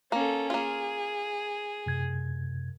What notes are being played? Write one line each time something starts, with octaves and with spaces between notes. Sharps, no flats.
A#3 C#4 A4
A#3 F4 G#4
F#2 C3 G#6